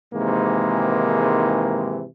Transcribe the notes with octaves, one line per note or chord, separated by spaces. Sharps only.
G#2 C3 D#3 E3 G#3 A#3